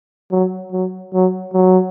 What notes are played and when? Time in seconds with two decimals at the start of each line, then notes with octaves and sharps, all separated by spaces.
0.32 F#3
0.72 F#3
1.14 F#3
1.54 F#3